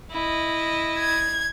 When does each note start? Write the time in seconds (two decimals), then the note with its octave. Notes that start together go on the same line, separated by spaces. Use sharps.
0.11 E4 D#5
0.98 G#6